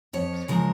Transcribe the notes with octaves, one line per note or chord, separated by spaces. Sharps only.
F2 C#5
C#3 F3 G#3 A#4